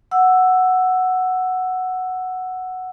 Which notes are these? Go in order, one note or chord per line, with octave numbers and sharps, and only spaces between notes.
F#5 E6